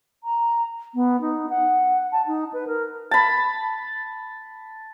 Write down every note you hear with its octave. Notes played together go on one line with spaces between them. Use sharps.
A#5
B3
D#4
F#5
A5
D#4
B4
A#4
A5 B5